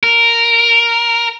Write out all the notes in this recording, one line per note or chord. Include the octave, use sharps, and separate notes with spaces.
A#4